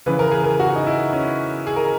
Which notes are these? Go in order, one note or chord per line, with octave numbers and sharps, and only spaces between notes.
C#3 E3 B4
A#4
G#4
A#4
F#4
D#4
E4
C#4
G#4
A#4